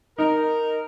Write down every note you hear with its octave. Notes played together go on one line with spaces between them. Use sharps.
D#4 A#4